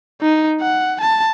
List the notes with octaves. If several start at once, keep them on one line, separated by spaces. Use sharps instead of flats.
D#4
F#5
A5